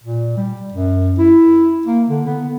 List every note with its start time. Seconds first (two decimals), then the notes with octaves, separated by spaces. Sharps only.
0.04 A#2
0.37 G3
0.72 F#2
1.18 E4
1.86 A#3
2.09 D3
2.27 B3